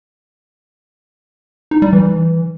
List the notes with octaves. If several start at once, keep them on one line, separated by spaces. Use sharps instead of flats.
D#4
G3
E3